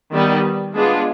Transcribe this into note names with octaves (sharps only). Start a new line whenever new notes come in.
D#3 G3 B3 D#4
G#3 B3 D4 F4 G#4